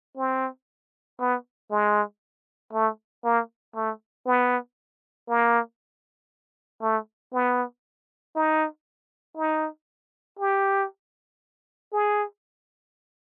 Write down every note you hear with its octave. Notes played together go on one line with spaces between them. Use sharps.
C4
B3
G#3
A3
A#3
A3
B3
A#3
A3
B3
D#4
D#4
G4
G#4